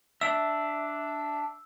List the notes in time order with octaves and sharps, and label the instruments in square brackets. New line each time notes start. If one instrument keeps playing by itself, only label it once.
[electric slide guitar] D4 E5 [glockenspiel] E6